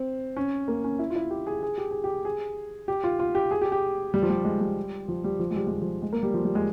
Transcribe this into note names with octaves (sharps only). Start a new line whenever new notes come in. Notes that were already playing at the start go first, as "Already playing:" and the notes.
Already playing: C4
C#4
A#3
C#4
E4
F4
E4
G4
G#4
G#4
G4
G#4
G4
G#4
G4
F4
F4
G4
G#4
G4
G4
G3
F3
G3
G#3
G3
F3
G3
F3
G#3
G3
G#3
G3
F3
G#3
A#3
G3
F3
G3
G#3